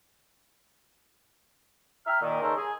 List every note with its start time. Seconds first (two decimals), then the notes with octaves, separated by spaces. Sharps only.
2.07 E5 G5 A#5 F6
2.21 A#2 D#3
2.41 C#3 C#4 D#4 A4 A#4 C5
2.57 G#4